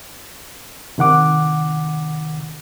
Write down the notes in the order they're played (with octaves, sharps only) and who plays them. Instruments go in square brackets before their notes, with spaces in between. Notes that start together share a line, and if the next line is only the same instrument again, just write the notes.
[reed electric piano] C3 D#3 F#5 D6